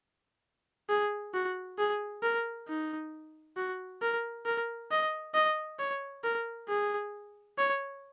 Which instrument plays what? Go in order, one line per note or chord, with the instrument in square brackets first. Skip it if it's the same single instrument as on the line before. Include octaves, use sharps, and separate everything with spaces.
[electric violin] G#4
F#4
G#4
A#4
D#4
F#4
A#4
A#4
D#5
D#5
C#5
A#4
G#4
C#5